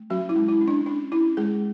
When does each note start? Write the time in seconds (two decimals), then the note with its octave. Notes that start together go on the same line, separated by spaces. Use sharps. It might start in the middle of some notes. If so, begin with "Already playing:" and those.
Already playing: A3
0.10 F#3 C#4 F#4
0.29 E4
0.36 G#3
0.49 E4
0.61 C#4
0.68 D4
0.86 C#4 D4
1.12 C#4 E4
1.37 G#3 G#4